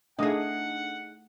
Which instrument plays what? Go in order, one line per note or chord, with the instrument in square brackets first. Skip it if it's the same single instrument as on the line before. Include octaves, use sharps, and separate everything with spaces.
[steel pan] A3 D#5 [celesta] D4 [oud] D#4 G#4 [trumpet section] F#5